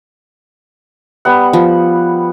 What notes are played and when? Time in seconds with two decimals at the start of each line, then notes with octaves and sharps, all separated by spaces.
1.25 G3 B3 F#5
1.53 F3